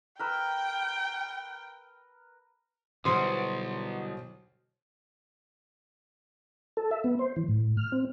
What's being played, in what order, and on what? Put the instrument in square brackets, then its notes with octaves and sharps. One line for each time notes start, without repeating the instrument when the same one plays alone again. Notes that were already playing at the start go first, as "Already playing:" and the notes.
[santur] A#4 B4 E6 [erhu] G5
[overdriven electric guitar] B1 [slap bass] B2 [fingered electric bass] D3 E3 G3 [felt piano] C5 C6 D#6
[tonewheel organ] A4
E5
B3
C5
E3
A2
F6
C4